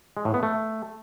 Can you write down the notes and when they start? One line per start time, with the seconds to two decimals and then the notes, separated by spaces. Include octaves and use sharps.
0.17 G#3
0.25 A2
0.34 B3
0.43 A3